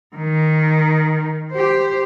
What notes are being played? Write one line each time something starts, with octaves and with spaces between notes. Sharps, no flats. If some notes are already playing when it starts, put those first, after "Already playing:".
D#3
G4 C5